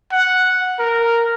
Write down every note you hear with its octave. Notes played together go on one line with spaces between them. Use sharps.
F#5
A#4